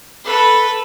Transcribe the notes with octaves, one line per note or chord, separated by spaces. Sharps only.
A4 B4